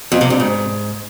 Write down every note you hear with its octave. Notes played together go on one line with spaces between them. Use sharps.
F2
C3
G2
G#2